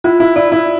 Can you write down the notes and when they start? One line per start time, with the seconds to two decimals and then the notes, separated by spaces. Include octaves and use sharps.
0.04 E4 F4
0.20 E4
0.36 E4 D5
0.52 E4